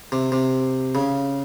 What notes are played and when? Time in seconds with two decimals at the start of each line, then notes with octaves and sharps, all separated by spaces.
0.12 C3
0.32 C3
0.95 C#3